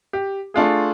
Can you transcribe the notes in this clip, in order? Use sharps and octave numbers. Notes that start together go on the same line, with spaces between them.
G4
A3 D4 F4 G#4